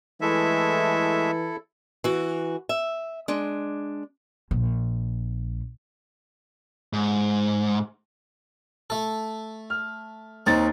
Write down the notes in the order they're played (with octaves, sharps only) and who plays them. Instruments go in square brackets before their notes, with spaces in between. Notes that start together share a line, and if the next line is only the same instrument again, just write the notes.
[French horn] E3 [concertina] G#3 A3 E5 [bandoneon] E4 A4
[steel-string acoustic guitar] E3 F#4
E5
G#3 D4
[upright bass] A#1
[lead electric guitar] G#2
[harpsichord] A3 A4
[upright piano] F6
[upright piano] D#2 D#4 A6 [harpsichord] C4